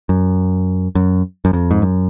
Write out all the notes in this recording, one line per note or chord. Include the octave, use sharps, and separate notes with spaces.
F#2
F#2
F#2
F2
G#2
F#2